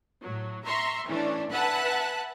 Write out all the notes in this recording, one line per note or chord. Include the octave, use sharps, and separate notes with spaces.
A2 F#3
E5 A#5 C6 C#6
E3 A3 C#4 D4
B4 E5 F#5 G#5 A5 F#6